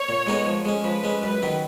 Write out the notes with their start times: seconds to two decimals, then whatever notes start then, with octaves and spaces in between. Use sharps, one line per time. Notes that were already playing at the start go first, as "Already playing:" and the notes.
Already playing: C#5
0.09 A#2
0.27 G#3 B3 D#4 A#4
0.46 F3
0.65 G#3 C#4
0.84 F3 B4
1.04 G#3 C#4
1.23 F#2 B4
1.42 D#3 F#3